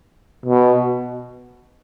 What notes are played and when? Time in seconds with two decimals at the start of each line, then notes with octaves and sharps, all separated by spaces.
0.46 B2